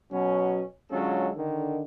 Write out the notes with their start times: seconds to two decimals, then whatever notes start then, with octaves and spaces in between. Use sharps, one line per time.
0.12 B2 F#3 C#4
0.91 D3 F#3 G#3 C#4 F4 A4
1.37 D3 D#3